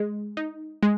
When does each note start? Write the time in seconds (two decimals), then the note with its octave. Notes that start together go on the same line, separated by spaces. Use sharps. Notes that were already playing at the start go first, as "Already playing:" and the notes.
Already playing: G#3
0.37 D#4
0.83 G#3